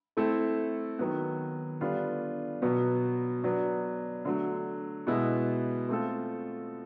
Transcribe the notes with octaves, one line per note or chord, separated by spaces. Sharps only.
A3 C4 E4 A4
D#3 F#3 B3
D3 G3 B3 D4 F4
B2 F#3 B3
F#3 B3 D4
D3 F#3 A3
B2 G#3 B3 E4
A3 C4 F4 A4